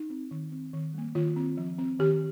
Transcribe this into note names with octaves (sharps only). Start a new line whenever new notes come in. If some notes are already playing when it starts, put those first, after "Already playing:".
Already playing: D#4
C4
D#3
C4
D#3
G3 A#3
D#3 F4
C4
F3
C4
D#3 G4